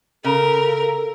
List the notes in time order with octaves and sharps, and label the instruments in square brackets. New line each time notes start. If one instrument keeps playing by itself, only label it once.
[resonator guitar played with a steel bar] C#3 [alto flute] A4 [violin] A#4